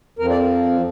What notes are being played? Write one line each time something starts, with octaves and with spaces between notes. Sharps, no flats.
F2 F3 C4 A#4
D5